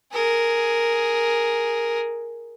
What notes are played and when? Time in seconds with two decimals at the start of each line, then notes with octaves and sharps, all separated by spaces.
0.13 G#4 A#4